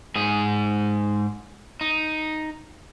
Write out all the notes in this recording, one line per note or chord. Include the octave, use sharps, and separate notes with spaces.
G#2 G#4
D#4